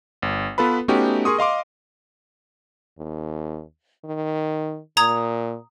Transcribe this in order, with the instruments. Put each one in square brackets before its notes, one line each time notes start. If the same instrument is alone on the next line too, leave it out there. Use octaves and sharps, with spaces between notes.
[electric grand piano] G1
B3 F4 A4 B4 B5
A3 B3 C#4 D#4 F#4 G4
G#4 A#4 C6 C#6 D#6
D#5 F5 C6 D6
[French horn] D#2
D#3
[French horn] A#2 [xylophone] A#5 D#6 G#6